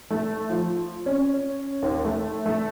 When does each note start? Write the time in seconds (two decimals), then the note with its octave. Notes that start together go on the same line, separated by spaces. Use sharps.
0.10 A3
0.50 F3
1.06 C#4
1.82 D#2
2.05 A3
2.46 A3